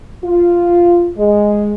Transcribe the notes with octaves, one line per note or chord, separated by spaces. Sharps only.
F4
G#3